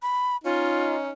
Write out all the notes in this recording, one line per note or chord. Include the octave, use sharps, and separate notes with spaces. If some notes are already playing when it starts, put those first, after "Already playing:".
B5
C#4 D#4 F4